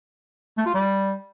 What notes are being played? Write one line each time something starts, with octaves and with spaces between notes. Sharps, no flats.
A3
F4
G3